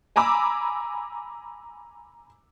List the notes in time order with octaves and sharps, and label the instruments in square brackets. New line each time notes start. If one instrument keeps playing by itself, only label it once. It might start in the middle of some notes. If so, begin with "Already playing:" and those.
[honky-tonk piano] G#5 A#5 B5 D6 E6